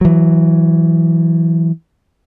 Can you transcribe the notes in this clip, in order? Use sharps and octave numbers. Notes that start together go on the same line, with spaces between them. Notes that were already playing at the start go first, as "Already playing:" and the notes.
E3 F#3